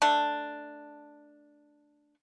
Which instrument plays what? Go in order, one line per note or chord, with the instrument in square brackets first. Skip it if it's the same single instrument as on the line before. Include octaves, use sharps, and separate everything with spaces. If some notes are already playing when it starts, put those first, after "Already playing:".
[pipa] A3 D4